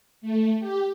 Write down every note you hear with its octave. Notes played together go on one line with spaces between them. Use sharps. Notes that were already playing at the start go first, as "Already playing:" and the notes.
A3
G4